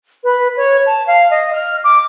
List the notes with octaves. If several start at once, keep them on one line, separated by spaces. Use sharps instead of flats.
B4
C#5
A5
F5
D#5
F6
D6